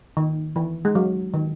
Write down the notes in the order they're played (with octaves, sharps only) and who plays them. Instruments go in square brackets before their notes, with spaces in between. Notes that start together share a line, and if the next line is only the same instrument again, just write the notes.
[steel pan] D#3
E3
G#3
F#3
D#3